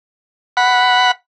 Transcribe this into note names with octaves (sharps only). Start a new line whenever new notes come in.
F#5 B5